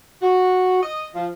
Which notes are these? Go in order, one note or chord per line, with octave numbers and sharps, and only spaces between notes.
F#4
D#5
F3